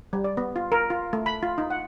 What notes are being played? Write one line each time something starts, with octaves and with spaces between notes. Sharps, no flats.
G3
D5
B3
F4
A#4
F4
A3
B5
F4
D#4
F#5